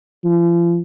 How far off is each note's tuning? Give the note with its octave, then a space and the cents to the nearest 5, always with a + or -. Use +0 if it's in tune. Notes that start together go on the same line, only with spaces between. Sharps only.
F3 -40